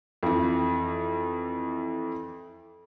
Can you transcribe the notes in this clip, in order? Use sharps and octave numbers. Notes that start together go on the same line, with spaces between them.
F2 E3